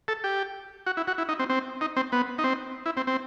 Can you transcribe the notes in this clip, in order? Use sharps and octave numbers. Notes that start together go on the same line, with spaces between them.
A4
G4
F#4
E4
F#4
E4
D#4
C4
C4
D#4
C4
B3
D#4
C4
E4
C4
C4